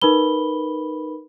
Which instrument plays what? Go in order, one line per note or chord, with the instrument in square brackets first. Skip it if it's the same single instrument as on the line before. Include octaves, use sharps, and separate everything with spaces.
[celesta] D#4 A#4 B4 B5 G7